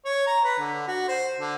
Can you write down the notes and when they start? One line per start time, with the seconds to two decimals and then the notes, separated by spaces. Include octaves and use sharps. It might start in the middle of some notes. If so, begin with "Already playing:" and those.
0.05 C#5
0.27 A#5
0.44 B4
0.59 D3
0.88 F#4
1.08 C5
1.38 D3